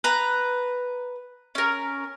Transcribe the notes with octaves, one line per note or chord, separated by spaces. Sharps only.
B4 A#5
C#4 A#4